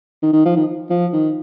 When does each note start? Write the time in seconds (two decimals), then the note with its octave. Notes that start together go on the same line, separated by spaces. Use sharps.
0.23 D#3
0.33 D#3
0.45 F3
0.57 D#3
0.90 F3
1.13 D#3